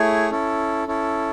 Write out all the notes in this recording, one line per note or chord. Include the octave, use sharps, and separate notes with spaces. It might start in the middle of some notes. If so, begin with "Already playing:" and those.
Already playing: A3 E4 G#4 C#5
C#4 E4 A4
C#4 E4 A4